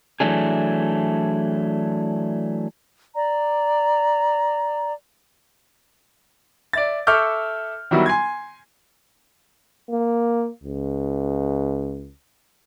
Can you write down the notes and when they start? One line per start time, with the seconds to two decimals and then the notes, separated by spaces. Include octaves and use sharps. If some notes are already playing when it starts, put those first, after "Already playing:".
0.20 E3 F#3 A3 D4 G#4
3.14 D5 A#5
6.73 D5 E5 A6
7.07 A4 E5 C#6 D6 F6 G6
7.91 D#3 F#3 G3 B3 E4 F#4
8.06 G#5 C6 G#6
9.90 A#3
10.64 C#2